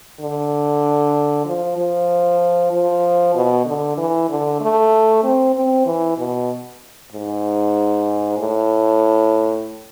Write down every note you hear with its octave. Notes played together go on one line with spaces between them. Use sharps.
D3
F3
F3
F3
B2
D3
E3
D3
A3
C4
C4
E3
B2
G#2
A2